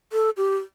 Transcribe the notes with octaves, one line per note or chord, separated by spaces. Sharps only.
A4
G4